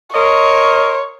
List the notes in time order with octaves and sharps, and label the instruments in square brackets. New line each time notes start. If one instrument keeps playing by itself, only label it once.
[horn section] A#4 D#5 C6 [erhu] C#5